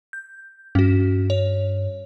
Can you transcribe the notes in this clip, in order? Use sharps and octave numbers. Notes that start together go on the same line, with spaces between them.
G6
G2 C#4 F#4
C#5